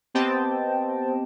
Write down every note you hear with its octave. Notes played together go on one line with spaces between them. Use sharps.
B3 C4 G4 D#5 G5 A5